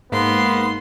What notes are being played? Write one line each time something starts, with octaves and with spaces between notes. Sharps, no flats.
G#2 A#3 B3 C6